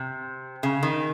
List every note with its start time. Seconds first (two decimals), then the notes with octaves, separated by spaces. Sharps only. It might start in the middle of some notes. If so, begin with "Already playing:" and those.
Already playing: C3
0.63 C#3
0.83 D#3